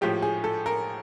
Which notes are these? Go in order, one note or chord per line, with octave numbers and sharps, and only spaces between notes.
A2 F3 G#3 G4
G#4
A4
A#4